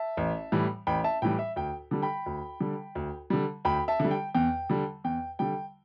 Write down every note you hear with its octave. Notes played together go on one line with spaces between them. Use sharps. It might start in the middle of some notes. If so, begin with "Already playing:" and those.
Already playing: E5 A5
A1
A2 E3 G3
A1 G5 B5
E5 A5
A2 E3 G3 G5
E5
D2 G5
D3 G3
G5 B5
D2
D3 G3
D2
D3 G3
D2 G5 B5
E5 A5
D3 G3
G5
E2 G5
D3 G3
E2 G5
D3 G3 G5